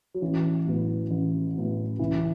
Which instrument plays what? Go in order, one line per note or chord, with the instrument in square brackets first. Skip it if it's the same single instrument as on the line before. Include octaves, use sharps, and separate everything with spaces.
[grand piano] F#3
[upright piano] A1 [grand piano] E3
[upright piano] A2 F#3 B3 E4
A1
A2 F#3 B3 E4
[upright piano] C#2 [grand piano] E3